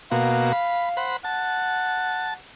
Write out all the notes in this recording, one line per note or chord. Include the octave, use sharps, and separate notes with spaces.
B2 A#3 F#4 F5
B5
C5 F#5 B5
F#5 A5